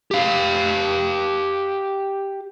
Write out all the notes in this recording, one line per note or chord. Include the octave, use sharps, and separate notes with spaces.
G4 F5